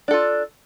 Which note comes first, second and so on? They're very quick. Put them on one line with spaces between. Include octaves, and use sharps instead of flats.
D4 A4 F4